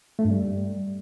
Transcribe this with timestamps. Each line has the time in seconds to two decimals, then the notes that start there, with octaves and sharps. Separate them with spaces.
0.19 A3
0.25 G2
0.31 G3